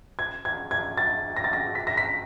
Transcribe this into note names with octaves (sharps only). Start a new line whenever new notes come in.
G#6
G#6
G#6
A6
A#6
A6
A#6
B6
A#6
B6